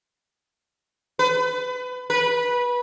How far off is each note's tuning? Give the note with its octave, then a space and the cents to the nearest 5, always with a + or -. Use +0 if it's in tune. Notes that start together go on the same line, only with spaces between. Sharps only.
B4 +25
B4 -20